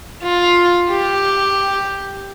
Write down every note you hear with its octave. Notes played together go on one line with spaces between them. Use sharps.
F4
G4